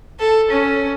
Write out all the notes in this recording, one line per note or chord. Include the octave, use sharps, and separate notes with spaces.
A4
C#4